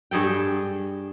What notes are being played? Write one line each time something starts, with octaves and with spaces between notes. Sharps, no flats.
G2 G#4 A4 G5